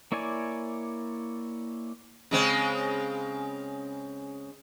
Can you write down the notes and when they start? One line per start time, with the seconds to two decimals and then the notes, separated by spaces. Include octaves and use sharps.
0.12 A#3 E4 C#5 D5 G#5
2.31 C#3 G#3 C4